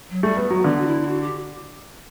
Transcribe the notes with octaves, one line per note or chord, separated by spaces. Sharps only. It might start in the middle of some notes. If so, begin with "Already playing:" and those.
F#3
G3 A3
B3
F#3 B3
D3 B3
F#4
E4
E4
F#4
G4